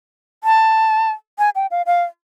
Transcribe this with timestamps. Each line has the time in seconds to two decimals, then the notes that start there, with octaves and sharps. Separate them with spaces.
0.44 A5
1.39 G#5
1.55 G5
1.71 F5
1.86 F5